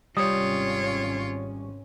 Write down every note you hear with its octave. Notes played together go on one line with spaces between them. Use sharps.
G#1 C3 G3 C#4 F4 C#5 D#6